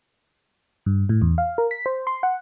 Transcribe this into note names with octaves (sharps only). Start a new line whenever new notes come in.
G2
A2
E2
F5
A#4
B6
C5
C6
F#5